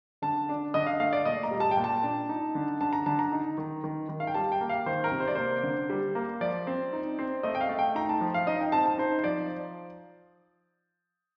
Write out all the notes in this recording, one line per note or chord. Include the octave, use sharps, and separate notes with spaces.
D3 A5
D4
D3 D#5
F5
A3 F5
D5
A#2 D#5
A#5
G3
A5
G5
A#2
A5
D4
D#4
D3
D3 A5
A#5
D3 A5
A#5
D#4
D#3
D#3
D#3
F5
G5
G3 A5
G5
A#3
F5
D#3 C5
A#4
C3
C5
D5
A#3 C5
D3
G3
A#3
F3 D5
C4
D#4
C4
A3 D#5
G5
F5
A3
G5
D#4 A#5
A5
F3
F5
D#4 D#5
G5
C4 A5
A5
D#4 C5
C5
F3 D5